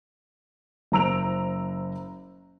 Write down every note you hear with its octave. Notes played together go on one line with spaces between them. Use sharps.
F#1 C5 A#5 E6 D7 F7